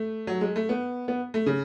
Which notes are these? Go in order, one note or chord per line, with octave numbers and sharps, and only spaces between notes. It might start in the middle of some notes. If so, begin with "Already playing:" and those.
Already playing: A3
F#3
G#3
A3
B3
B3
A3
C#3